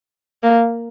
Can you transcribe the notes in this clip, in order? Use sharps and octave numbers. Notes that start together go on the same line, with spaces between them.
A#3